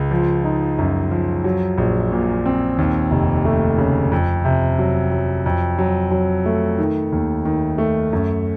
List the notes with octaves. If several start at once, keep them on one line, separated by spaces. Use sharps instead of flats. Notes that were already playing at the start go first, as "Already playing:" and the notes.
Already playing: C#2
F3
D#4
F#2
F3
F#3
A#1
A#2
C4
D#2
F1
A3
C#3
F2
C3
F#3
F#3
F2
F#3
F#3
A3
D#3
D#2
D#3
A3
F#2